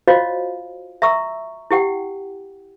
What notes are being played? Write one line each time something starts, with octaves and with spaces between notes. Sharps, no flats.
F4 F#4 C5 C#5 D#5 F5
E5 A#5 C#6 E6
E4 G4 F#5 G5